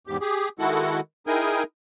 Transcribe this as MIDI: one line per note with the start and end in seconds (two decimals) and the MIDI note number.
0.07 0.17 40
0.07 0.17 44
0.07 0.17 67
0.21 0.49 67
0.21 0.49 68
0.59 1.00 51
0.59 1.00 56
0.59 1.00 64
0.59 1.00 66
0.59 1.00 69
0.59 1.00 78
1.27 1.63 63
1.27 1.63 64
1.27 1.63 68
1.27 1.63 70
1.27 1.63 79
1.27 1.63 80